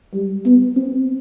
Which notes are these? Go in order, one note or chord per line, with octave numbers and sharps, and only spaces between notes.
G3
B3
C4